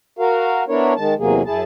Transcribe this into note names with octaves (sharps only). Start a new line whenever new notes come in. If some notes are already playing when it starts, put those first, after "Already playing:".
F#4 A#4 F5
B3 D4 E4 A#4 C#5
D#3 G#3 A5
E2 C3 F#3 A#3 G#4
F#2 E4 G#4 A5